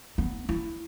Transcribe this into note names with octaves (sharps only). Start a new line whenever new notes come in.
B3
E4